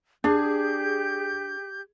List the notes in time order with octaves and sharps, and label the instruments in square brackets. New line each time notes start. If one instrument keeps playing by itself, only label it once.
[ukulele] D4 [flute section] G4 G6 [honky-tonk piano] G#4